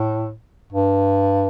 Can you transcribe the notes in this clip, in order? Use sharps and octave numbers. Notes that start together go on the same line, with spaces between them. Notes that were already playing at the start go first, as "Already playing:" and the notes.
Already playing: A2
G2